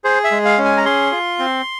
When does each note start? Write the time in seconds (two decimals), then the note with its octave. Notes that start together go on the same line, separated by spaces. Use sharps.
0.04 G#4 C5
0.24 E5
0.31 G#3
0.45 F5
0.58 C#4
0.65 G#5
0.77 A#5
0.85 G#4 C6
1.12 F4
1.39 C4